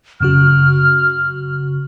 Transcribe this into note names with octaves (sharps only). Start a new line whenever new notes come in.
F#2 C#3 F#4 F6